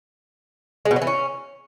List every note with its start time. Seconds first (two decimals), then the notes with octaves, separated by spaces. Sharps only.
0.85 G#3
0.91 B2
0.96 F#3
1.02 E3
1.07 C#4